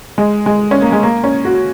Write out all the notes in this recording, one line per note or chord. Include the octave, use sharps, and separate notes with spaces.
G#3
G#3
C#4
A#3
G#3
A#3
C#4
F#4